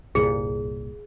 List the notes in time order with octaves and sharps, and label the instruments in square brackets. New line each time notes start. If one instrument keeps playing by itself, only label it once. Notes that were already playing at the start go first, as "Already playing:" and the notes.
[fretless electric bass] C2 G2 A#2 [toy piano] G#4